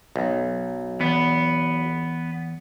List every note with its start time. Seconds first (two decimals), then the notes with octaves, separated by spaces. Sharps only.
0.16 B1
1.01 E2 B3